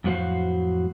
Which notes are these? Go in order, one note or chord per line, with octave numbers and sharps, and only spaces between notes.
F2 A2 F#3 F#4 C5 F5